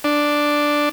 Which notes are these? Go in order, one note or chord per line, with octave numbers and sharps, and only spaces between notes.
D4